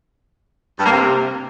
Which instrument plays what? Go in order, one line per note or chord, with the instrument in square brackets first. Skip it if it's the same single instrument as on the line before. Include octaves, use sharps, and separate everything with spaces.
[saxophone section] G2
A#3
C3